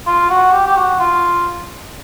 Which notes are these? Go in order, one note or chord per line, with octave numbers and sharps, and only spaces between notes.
F4
F#4
G4
G4
F#4
F4